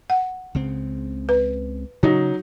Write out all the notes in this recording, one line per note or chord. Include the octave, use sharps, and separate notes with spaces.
F#5
C#2 C#3 C4
B4
C#3 F#3 D#4